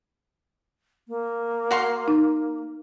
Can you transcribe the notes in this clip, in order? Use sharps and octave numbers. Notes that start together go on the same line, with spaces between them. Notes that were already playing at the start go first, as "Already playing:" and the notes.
A#3
F#4 F5 C6
D#4